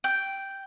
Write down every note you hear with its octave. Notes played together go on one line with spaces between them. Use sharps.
G5